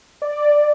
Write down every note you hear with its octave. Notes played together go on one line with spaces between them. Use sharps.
D5